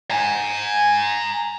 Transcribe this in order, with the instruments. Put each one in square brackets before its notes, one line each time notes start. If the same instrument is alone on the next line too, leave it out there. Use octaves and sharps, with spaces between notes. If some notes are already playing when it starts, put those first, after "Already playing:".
[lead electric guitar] G#5 A#5